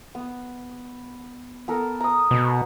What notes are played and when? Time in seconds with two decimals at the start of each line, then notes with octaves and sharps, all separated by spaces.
0.15 B3
1.68 B3 A4 A#4
2.00 A#5 D#6
2.31 B2